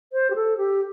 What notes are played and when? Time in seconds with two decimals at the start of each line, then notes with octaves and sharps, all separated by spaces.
0.13 C5
0.30 G4
0.35 A4
0.57 G4